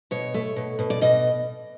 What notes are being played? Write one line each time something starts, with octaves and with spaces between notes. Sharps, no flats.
B2 C#5
A3
B2
B2
D5
B2 D#5